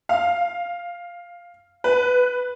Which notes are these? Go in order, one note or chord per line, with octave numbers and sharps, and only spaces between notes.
F5
B4